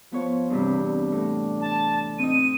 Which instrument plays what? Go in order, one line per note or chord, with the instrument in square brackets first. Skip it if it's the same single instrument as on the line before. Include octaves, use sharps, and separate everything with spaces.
[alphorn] F3 [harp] B3 C#5
[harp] E2 G2 C3 [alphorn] D4
[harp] C3
A2
[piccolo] A5
[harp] C4 D#4 [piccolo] D#7